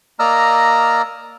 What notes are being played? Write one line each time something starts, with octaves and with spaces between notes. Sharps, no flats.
A#3 D5 D#5 A#5 E6 F6